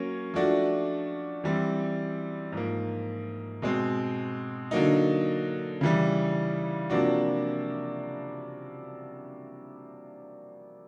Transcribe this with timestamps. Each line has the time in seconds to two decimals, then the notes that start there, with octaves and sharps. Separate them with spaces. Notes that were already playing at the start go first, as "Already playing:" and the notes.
Already playing: F#3 A#3 C#4
0.34 F3 A3 D4 F#4
1.44 E3 G3 C4
2.52 G#2 F3 A#3
3.62 B2 G#3 C4
4.71 D3 F#3 A#3 D#4
5.81 C#3 E3 G3
6.90 C3 F3 A#3 D4 F#4